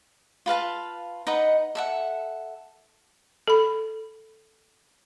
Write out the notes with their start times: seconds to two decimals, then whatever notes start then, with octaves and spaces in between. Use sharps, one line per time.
0.46 F4 B4 F5 A5
1.27 D#4 B4 D#5 F#5
1.75 A4 E5 F#5
3.48 A4 B5